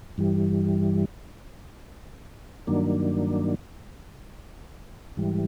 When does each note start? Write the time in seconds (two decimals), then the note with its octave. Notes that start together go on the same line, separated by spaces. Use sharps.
0.18 G2 E3 G3
2.67 G2 D#3 F#3 A#3 D4
5.17 G#2 E3 G3